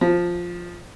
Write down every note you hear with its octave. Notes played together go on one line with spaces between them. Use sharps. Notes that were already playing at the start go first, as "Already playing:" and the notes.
F3